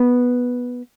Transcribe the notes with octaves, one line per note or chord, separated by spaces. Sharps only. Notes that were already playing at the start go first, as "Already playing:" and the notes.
Already playing: B3